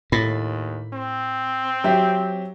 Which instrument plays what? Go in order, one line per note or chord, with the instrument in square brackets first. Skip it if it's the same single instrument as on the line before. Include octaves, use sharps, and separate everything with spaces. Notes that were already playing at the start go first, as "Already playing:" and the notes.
[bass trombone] D#2 [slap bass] A2 [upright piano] B5
[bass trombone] C4
[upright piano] F#3 G4 E5